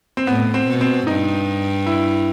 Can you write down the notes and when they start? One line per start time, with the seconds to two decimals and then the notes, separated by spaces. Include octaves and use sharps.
0.17 C4
0.27 A2 B3
0.54 C4
0.68 B2
0.81 C4
1.07 G2 D#4
1.86 E4